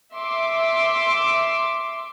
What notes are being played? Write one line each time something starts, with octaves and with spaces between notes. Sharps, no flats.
E5 C6 D6